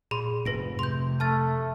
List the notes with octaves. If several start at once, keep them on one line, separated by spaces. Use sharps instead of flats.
A#2 G#4 B5 C6
F1 G#2 B4 A#6 D7
C3 C6 G6
A3 A5 F6 A6